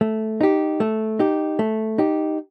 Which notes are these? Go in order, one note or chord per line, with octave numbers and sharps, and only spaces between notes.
A3
D#4 G4
A3
D#4 G4
A3
D#4 G4